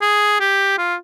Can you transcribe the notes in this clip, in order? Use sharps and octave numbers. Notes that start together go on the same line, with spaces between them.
G#4
G4
F4